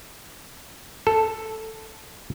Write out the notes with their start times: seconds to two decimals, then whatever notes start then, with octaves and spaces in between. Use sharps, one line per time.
1.07 A4